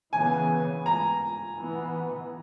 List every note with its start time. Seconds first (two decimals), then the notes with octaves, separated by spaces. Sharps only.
0.13 C#3 E3 B3 G#5
0.86 A#5
1.59 E3 B3